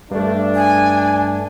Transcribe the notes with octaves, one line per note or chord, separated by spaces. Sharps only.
G2 A3 D4
G#5